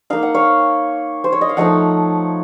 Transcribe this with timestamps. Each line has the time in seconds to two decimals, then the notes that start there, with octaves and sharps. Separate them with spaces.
0.10 A#3 D#4 F5
0.23 F#5
0.35 C#5 F5
1.24 C5
1.32 C#5
1.41 D#5
1.49 F5
1.57 F3 A3 D#4 D#5 F#5